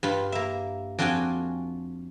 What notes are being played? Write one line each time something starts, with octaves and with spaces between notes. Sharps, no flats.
G2 F4 B5
A#3 E5
F2 D4 F4 F#4 G5 G#5